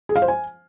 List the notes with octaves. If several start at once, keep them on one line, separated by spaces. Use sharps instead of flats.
G#4
F5
C5
G#5